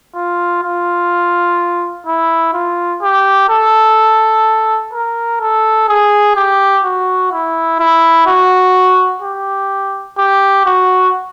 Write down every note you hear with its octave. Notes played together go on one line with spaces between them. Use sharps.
F4
F4
E4
F4
G4
A4
A#4
A4
G#4
G4
F#4
E4
E4
F#4
G4
G4
F#4